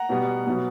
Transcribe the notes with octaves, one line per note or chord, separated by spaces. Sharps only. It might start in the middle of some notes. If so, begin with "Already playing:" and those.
Already playing: F#5 A#5
B2 G3 B3
B2 F#3 B3